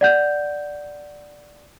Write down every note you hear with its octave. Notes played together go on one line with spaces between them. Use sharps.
D5 F#5 G6